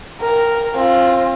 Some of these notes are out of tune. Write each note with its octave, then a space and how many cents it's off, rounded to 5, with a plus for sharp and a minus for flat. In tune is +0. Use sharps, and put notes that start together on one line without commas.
A#4 +0 G5 +10
C4 +30 F4 +0